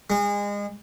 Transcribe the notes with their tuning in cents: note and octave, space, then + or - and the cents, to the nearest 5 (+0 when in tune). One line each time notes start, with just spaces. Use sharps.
G#3 -30